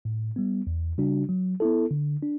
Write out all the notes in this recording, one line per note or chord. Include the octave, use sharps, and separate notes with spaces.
A2
G3 B3
E2
C#3 G3 D4 F#4
F#3
B3 E4 A4
D3
D4